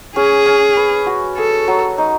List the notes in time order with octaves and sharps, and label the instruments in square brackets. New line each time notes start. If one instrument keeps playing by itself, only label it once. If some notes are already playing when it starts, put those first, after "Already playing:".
[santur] C#4 [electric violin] G#4
[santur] C#4
B4
F#4
[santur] G#4 [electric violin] A4
[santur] F#3
D#4